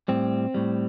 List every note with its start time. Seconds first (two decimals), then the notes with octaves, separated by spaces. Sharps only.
0.08 A2 G3 C4
0.54 A2 G3